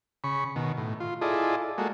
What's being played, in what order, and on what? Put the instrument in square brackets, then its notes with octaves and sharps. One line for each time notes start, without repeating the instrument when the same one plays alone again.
[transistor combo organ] C#3 B5 C#6
B2 D#3
A2
F4
E4 F4 G#4 A4 D5 D#5
G#3 A#3 F#4 A4